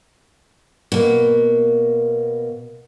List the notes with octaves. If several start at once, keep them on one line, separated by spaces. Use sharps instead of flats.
B2 A#3